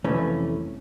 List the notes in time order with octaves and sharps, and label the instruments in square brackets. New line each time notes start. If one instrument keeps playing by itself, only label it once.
[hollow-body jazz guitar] C2 F2 E3 A3 C#4